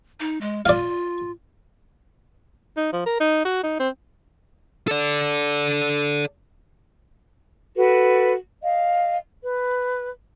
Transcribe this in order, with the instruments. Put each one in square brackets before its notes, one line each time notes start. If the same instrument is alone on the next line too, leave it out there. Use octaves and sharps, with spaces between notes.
[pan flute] D#4
G#3
[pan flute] F4 [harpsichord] D5 F5
[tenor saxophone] D#4
F3
A#4
D#4
F#4
D#4
C4
[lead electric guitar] A4 D5
[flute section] F#4 A4 B4
D#5 F5
B4